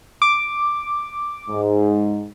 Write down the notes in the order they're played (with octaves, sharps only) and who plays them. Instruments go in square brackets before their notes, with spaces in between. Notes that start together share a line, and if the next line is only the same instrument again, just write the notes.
[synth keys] D6
[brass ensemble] G#2